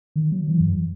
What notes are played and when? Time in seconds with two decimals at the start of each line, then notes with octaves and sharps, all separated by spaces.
0.16 D#3
0.32 F#3
0.48 E3
0.60 F#2